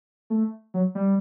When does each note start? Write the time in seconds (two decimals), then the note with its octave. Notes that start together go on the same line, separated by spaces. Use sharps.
0.30 A3
0.74 F#3
0.95 G3